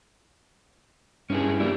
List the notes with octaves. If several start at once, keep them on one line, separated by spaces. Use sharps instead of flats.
G2 C#4 E4 G#4
G3 A#3 D4 E4